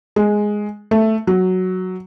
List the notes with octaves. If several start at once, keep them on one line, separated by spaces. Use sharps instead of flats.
G#3
A3
F#3